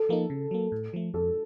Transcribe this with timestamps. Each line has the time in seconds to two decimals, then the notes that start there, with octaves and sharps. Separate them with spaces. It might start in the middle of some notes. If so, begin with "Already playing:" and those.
Already playing: A4
0.09 F3 A#3 D#4
0.30 C#3
0.51 F#3 A#3
0.72 A2
0.93 F3 A3
1.14 F2 A4